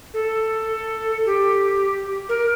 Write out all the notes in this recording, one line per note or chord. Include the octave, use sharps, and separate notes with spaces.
A4
G4
A#4